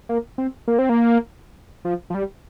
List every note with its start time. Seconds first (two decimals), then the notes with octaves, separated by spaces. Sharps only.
0.09 A#3
0.38 C4
0.68 A#3
0.79 C4
0.89 A#3
1.85 F3
2.10 F3
2.14 G3